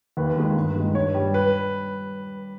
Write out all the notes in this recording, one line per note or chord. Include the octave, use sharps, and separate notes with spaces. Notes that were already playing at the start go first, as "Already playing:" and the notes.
D#2 B4
D#3 G#3
G2
D#3 G#3
G2 C#5
G3
B4